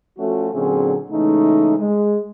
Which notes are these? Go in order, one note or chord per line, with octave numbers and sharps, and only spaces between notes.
F3 A3 C#4 F#4
A#2 D3 F#3 C4 C#4 G#4
C#3 E3 G#3 A3 D#4
G#3